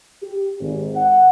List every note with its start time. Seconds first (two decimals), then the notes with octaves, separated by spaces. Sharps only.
0.23 G4
0.60 G#1
0.96 F#5